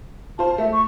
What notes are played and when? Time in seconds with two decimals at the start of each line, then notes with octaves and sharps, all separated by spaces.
0.39 F4 C5 A5
0.58 A3 E5
0.72 C#6